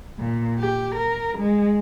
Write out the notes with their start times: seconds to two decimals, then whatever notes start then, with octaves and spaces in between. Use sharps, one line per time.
0.19 A#2
0.59 G4
0.95 A#4
1.38 G#3